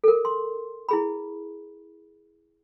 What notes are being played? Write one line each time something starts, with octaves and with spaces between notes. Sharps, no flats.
A4 A#4
C6
E4 G#4 B5